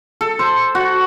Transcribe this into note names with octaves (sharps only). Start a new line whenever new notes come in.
A4
C5
F#4